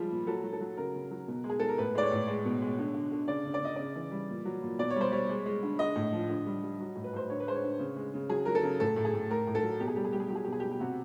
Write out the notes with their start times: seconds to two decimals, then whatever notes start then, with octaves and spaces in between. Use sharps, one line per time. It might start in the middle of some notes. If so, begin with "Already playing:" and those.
Already playing: F3 G3 G#3
0.11 A#2
0.27 F#3 A4
0.44 F#3
0.53 A4
0.61 F#3
0.77 C#3 A#4
0.95 C#3
1.11 F#3
1.28 B2
1.44 G#3
1.49 G#4
1.60 G#3 A4
1.68 A#4
1.78 A2 B4
1.95 G#3 D5
2.03 C#5
2.11 A2
2.28 G#3
2.45 B2
2.62 G#3
2.79 D3
2.94 D3
3.12 D3
3.28 C#3 D5
3.45 C#3
3.54 D5
3.62 C#3 D#5
3.76 C#3 D5
3.96 E3
4.11 G3
4.29 A#2
4.45 F#3
4.62 A#2
4.79 B2 D5
4.90 C#5
4.96 G3 C5
5.12 G3 C#5
5.29 G#3
5.46 G#3
5.63 D3
5.79 G#3 D#5
5.96 A2
6.12 F3
6.29 D3
6.46 G3
6.63 G3
6.80 F#3
6.95 A2
7.04 B4
7.13 A2 C5
7.30 D3 C#5
7.40 B4
7.47 G#3 C5
7.55 C#5
7.64 D3
7.79 C#3
7.96 G#3
8.14 C#3
8.29 F#3 G#4
8.45 F#3 A#4
8.55 A4
8.63 C#3
8.80 A2 A4
8.96 A2
9.05 G#4
9.14 A2
9.30 A2 A#4
9.47 A2
9.55 A4
9.63 F#3
9.80 B2 G4
9.88 G#4
9.96 G3 G4
10.04 G#4
10.13 G3 G4
10.19 G#4
10.28 F#3 G4
10.35 G#4
10.44 G4
10.47 B2 G#4
10.60 G4
10.64 B2
10.71 G4
10.80 C3 F#4